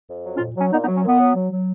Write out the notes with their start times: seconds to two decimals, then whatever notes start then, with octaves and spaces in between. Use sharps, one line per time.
0.08 F2
0.24 F#3
0.36 C#4 F4
0.40 A#2
0.56 F#3 C#4
0.72 A#2 B3 D#4
0.84 B3 D#4
0.87 F#3
0.96 C#4
1.04 A#2 B3
1.19 F#3
1.35 F#3
1.51 F#3